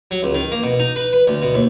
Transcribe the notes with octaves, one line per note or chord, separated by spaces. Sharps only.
F#3
C#2
D#3
A#3
B2
D#4
B4
B4
D2
B2
D#2